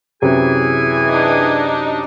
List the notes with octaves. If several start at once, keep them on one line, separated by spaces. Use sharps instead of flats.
F#2 C3 E3 G#4 G#5
D4 D#4